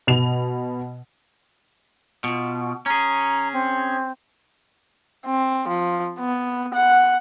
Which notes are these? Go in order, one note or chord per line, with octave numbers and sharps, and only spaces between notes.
B2 F7
B2 F4
C#4 G#4 A#5
C4
C4
F3
B3
F#5